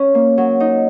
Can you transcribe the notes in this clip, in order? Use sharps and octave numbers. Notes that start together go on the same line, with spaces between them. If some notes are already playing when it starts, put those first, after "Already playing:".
Already playing: C#4
A#3
F#3
D#4